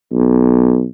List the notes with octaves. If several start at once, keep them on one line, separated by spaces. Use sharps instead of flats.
B1